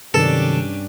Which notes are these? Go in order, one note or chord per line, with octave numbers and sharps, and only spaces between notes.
G2 C3 D#3 F#3 C#4 D4 G4 A4